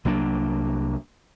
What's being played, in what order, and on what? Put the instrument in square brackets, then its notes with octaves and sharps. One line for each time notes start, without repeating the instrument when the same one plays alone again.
[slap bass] C2 F#3 A#3 D4